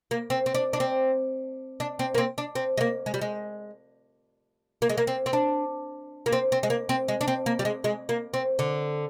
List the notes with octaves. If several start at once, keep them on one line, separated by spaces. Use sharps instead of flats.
A#3
C4
C4
D4
D4
C4
D4
C4
A#3
C4
D4
C4
G#3
A#3
G#3
G3
G#3
A#3
G#3
A#3
C4
C4
D4
A#3
C4
C4
G#3
A#3
C4
G#3
D4
C4
A#3
G3
G#3
G#3
A#3
C4
D3